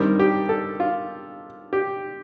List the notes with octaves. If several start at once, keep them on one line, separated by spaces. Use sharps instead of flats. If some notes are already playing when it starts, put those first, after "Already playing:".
Already playing: G2 D#3 G3 C4 A#4
G4
A4
F4
G4